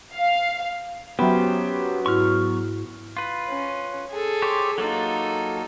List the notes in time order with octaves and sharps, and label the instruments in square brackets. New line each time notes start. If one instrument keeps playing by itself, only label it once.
[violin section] F5
[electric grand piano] F#3 B3 [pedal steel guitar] C#4 G4 C5 [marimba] E5 G5 B5
[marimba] G#2 E4 F#4 [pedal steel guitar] C#6 F6
[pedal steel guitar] F4 B4
[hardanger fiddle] C#4
G#4 A4
[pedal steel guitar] G4 C5 C#5
[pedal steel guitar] F#3 A#3 F4 [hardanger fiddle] D#4 A4